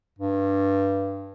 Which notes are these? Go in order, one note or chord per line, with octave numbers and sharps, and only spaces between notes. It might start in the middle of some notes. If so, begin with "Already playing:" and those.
G2